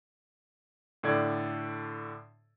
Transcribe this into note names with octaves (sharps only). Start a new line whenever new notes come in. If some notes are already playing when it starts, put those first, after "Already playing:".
A2 D3 A4 D5 G#6